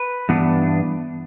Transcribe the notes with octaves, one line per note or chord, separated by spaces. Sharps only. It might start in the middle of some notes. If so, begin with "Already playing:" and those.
Already playing: B4
G2 E3 B3 D4